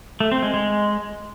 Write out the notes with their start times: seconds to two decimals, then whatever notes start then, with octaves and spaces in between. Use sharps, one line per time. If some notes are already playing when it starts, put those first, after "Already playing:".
0.20 A3
0.32 C4
0.43 G#3
0.54 G#3